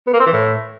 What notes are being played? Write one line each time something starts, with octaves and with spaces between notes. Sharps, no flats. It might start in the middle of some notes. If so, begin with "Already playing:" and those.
B3
A#3
C4
E3
A2